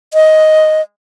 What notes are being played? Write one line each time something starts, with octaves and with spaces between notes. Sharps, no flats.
D#5